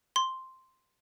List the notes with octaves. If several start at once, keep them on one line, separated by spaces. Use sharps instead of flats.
C6